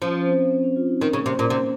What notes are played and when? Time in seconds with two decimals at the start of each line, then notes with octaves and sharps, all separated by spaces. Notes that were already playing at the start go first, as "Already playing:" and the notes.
0.02 F3 C#4
0.16 C#4
0.27 C4
0.51 C4
0.64 C#4
0.76 F4
0.89 D#4
1.01 D#3 C#4
1.13 C#3
1.18 A#3
1.26 C3
1.34 A#2 C#4
1.50 C3 C#4